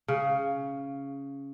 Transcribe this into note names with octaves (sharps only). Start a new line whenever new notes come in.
C#3